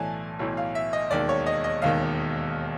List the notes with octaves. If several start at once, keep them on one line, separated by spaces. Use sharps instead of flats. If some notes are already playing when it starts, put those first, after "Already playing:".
Already playing: B1 A2 E3 D5 G#5 A5
B1 A2 E3
F5
E5
D#5
E1 D#2 D#3 D5
C#5
D#5
D#5
E1 D#2 D#3 F5